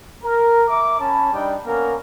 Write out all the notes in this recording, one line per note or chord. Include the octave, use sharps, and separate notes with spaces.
A#4
E5 A#5 D6
C#4 C#5 A5 B5
G3 D4 D#4 D5 G5
A#3 B3 C#4 A#4